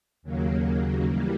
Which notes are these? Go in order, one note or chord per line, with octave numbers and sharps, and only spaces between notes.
D#2 C#3 F#3 A#3
E3 G3 A#3